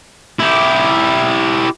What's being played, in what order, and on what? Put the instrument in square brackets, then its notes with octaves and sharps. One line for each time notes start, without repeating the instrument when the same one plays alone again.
[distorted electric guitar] E4 G4